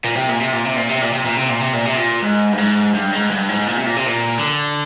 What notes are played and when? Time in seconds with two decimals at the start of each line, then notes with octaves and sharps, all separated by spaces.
0.05 A#2
0.17 C3
0.29 A#2
0.41 C3
0.53 A#2
0.65 C3
0.77 A#2
0.89 C3
1.02 A#2
1.13 C3
1.26 A#2
1.37 C3
1.49 A#2
1.61 C3
1.73 A#2
1.85 C3
1.97 A#2
2.22 G#2
2.53 G2
2.58 G#2
2.94 G2
3.13 G#2
3.31 G2
3.49 G#2
3.67 A#2
3.77 C3
3.87 A#2
3.97 C3
4.06 A#2
4.39 D3